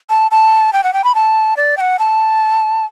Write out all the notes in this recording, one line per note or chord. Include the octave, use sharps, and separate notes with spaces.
A5
A5
G5
F#5
G5
B5
A5
D5
G5
F#5
A5